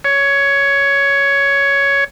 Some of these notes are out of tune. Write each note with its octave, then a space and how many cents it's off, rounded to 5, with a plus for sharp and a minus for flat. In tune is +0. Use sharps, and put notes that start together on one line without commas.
C#5 +10